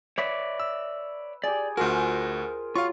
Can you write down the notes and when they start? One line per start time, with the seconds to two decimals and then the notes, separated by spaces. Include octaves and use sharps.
0.18 B4 C#5 D5 E5
0.60 E6
1.44 G4 G#4 D5
1.77 D2 F4 F#4 G#4 A#4 C5
2.76 F#3 F4 F5 C#6